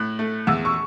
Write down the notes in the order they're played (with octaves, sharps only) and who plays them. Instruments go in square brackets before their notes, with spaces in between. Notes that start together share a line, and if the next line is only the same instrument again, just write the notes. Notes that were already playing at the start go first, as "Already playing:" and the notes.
Already playing: [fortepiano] A2 [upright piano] F#6
[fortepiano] A3
[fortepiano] E2 [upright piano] E6
[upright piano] C#6